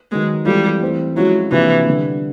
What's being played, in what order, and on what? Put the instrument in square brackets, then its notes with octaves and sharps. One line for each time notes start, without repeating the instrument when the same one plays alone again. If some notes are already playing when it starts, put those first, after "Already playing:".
[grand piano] D#3 F#3 B3 [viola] G#3
[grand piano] E3 G#3 C4 F4 A4 [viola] G3
[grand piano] E3 A3 C4
[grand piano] F3 G#3 C#4 E4 [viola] F#3
[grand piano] C3 F3 A#3 D4 [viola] E3
[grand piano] D3 G3 B3 D4